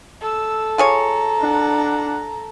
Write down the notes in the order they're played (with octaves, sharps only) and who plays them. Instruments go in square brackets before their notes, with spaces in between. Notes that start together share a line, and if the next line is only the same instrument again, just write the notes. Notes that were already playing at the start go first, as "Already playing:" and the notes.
[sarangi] A4 [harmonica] E6
[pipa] F4 G#4 C#5 [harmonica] A#5
[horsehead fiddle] D4 F#5